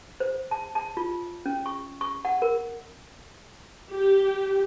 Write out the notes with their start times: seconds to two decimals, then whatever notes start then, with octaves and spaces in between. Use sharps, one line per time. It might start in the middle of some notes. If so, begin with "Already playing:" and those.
0.20 C5
0.51 A5
0.75 A5
0.97 F4
1.46 C#4
1.66 C#6
2.01 C#6
2.25 F#5
2.42 A#4
3.92 G4